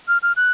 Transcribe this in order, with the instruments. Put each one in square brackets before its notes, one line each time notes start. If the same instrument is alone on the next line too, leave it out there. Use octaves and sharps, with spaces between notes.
[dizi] F6
F6
F#6